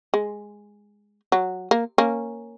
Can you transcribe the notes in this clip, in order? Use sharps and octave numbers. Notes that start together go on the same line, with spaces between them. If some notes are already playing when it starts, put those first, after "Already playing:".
G#3
F#3
A#3
A#3 C#4